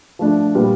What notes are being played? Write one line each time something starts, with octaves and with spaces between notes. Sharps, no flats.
F3 A3 D4
A#2 G3 B3